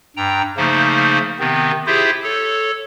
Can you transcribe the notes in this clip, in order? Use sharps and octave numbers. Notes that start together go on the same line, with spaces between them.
G2 G5 A#5
C#3 F3 A3 A#3 D#4 C5
C3 D#3 B3 C4
E4 F4 G4 G#4 C5 E5
A4 C#5